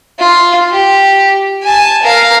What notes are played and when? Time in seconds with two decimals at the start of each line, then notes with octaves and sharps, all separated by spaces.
0.19 F4
0.72 G4
1.64 G#5 A5
2.03 A#4 F5